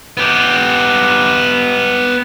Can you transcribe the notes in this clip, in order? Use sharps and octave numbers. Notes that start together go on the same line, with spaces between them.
B3 G4